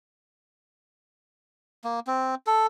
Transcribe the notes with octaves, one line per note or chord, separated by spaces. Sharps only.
A#3
C4
A4